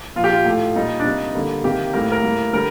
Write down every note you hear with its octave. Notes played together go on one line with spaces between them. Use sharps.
A#2 F3 A#3 F4
G4
F4
A2 A3
A#2 G3 A#3 D#4
D4
C3 G3 A#3 D#4
D3 G3 A#3
C3 D#3 A#3 G4
A2 G3 A#3 A#4
A#4
A2 G3 A#3
D3 G3 A#4